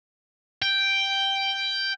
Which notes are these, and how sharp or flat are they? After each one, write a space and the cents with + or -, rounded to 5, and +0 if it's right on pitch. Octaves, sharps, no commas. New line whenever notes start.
G5 +0